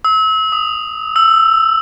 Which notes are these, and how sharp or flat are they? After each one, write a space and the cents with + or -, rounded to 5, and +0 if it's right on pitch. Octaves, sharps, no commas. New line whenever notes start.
E6 -35
D#6 -5
E6 +10